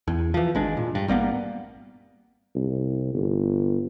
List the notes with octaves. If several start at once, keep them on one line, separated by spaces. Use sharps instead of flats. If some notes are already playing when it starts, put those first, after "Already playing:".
E2
E3 F3
G#1 G#3 D4
A#2
G2
G#1 G3 A#3 B3
C2
G1